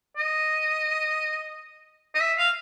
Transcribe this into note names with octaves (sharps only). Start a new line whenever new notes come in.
D#5
D#5
E5
F5